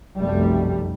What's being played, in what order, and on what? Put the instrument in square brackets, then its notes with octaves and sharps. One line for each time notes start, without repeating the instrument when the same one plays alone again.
[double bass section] F1 B1 F#2 G3 A3